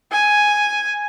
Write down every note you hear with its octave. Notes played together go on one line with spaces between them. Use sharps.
G#5